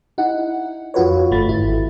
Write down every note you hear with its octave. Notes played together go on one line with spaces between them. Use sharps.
D#4 E4 F#5
F2 F4 F#4 B4 C#5
G1 A3 B5 A6
G#1 E4